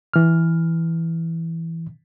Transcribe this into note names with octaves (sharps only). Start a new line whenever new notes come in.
E3 F6